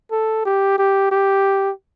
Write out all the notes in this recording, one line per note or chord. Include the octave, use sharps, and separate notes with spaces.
A4
G4
G4
G4